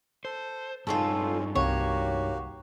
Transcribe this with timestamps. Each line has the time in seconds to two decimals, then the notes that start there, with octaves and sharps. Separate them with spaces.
0.25 A4 C5
0.87 G2 C4 C#4 D#4 F4 G4 A4
1.55 C2 A#3 C4 F#4 G4 C#5